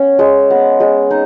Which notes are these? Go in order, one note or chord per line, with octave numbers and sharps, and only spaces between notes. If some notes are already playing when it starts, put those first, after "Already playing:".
Already playing: B3 C#4 C#5
G#3
B3
G#3
D#4